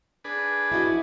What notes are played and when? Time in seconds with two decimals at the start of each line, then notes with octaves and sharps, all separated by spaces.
0.24 D4 G#4 B4
0.72 E4 F#4 D#5